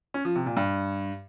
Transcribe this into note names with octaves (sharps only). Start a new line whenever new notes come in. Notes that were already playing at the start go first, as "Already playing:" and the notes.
C#4
F3
C3
A#2
G2